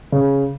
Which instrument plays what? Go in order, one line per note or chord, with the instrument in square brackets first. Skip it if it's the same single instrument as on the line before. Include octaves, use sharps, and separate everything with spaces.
[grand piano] C#3